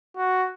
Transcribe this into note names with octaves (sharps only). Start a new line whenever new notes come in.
F#4